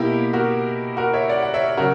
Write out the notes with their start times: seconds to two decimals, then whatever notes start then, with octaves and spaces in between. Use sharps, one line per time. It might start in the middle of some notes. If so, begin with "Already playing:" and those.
Already playing: B2 A#3 E4 G4
0.33 F#4 A#4
0.97 F#4 A#4
1.13 C#5 E5
1.29 D5 F#5
1.42 F#5
1.54 C#5 E5
1.77 C#3 F#3 F#4 A#4